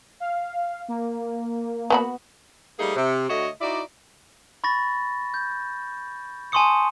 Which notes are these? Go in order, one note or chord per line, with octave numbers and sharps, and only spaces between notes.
F5
A#3
B3 F#4 B5
G3 A3 A#3 D#4 G#4
C3
D3 A3 F#4 C#5 D#5
D#4 E4 F#4 D5
B5 C#6 A6 A#6
G6
G#5 A5 C6 C#6 D#6 C#7